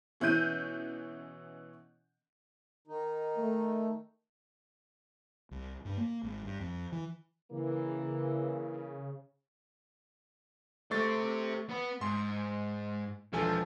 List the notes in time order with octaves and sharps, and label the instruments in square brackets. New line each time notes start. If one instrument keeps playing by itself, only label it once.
[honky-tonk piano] B2 E3 C#4 F#6 G6 D#7
[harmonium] D#3 D#4
[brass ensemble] A3
[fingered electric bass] C2
G2
A#3
G#1
G2
F2
E3
[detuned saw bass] C#3 [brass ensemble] E3 A#3
[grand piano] A3 C#6 A6 [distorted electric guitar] G4 C5
[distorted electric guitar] B3 B4
[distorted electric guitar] G#2 [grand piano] C6
[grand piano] E1 A4 G#5 [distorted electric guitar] F3